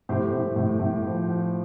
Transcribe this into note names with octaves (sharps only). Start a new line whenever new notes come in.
A2 G4 C5
A2
A2
A2
F3
F3